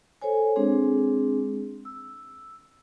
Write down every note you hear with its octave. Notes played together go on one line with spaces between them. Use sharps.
A4 C5 C#5 G#5
G#3 C4 D4 G#4
E6